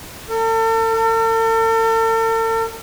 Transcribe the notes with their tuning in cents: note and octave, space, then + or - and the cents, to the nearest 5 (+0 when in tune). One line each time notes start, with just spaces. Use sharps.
A4 +40
A4 +45